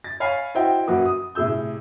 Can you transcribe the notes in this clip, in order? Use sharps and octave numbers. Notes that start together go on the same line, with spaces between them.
A6
C#5 F5 G#5 B5 F6 C7
E4 F#4 C5 D#5 E5 G5
F#2 A#3 F#4 B4 D6
D#6
A2 C3 G#4 E6 G6